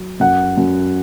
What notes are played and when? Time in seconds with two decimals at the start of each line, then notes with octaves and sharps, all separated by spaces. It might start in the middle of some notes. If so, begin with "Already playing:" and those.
Already playing: F#3
0.20 F#2 F#5
0.58 F#2